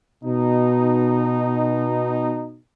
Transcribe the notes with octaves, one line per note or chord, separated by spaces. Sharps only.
B2 D#4